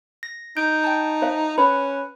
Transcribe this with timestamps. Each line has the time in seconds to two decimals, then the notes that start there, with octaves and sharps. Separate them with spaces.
0.23 A#6
0.57 D#4 G6 D7
0.84 G5 A5
1.22 C5 E5 F5
1.58 C#4 B4 B5